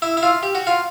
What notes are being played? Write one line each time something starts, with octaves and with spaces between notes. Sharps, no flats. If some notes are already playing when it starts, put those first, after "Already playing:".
E4
E4
F4
G4
F#4
F4